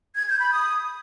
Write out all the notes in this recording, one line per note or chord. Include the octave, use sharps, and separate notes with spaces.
G#6
G6
B5
D#6